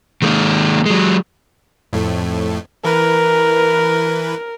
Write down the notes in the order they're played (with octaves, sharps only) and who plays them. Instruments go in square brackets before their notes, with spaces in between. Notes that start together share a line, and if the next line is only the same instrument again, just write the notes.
[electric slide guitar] D#3 G#3 A#3
F#3 G#3
[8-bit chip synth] F2 A2 A3
[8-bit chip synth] E3 B4 [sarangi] A#4